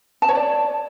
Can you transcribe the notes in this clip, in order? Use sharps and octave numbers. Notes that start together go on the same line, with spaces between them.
A5
C#5
D5